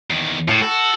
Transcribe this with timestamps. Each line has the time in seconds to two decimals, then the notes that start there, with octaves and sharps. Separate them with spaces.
0.10 E2 D#3
0.48 A2 F4 A4
0.62 F#4 A4